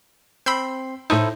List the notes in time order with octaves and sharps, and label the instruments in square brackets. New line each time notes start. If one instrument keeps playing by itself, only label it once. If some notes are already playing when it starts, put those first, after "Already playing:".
[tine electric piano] C4 C6 [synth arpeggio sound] B5 E6 G6
[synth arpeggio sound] A2 D#4 [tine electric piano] E4 A4 C5